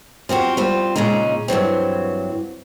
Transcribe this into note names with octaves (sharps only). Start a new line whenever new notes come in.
F3 C4 F#4 G4
G3 C4 F4
A#2 C#3 G#3 C#4 D#4
G2 E3 F#3 C4